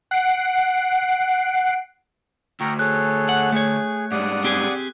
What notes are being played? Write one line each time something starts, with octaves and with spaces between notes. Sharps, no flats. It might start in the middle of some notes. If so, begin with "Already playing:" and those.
F#5 C7 D7
D2 G5 A#5 C#6
G#4 A4 C#5 F#6
F#5
A3 G#4 C#5
G#2 G3 D5 F#5 D#6
C4 G4 G#4